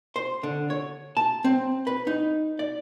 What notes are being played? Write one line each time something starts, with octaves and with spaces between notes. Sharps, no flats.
C5
D3
C#5
A5
C4
B4
D#4
D5